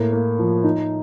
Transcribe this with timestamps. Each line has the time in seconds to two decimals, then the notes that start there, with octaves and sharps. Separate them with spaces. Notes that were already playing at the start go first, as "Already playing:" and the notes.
Already playing: A2 A#3
0.13 A#3
0.39 F3
0.64 D#4